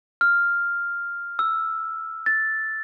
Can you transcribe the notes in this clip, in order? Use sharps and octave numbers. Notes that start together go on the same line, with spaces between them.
F6
E6
A6